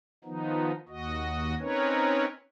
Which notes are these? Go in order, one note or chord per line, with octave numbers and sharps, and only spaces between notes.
D#3 F3 B3 D#4
D#2 F#4 D#5
C4 C#4 D#4 A#4 B4 C#5